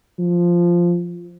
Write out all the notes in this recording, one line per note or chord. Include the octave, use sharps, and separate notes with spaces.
F3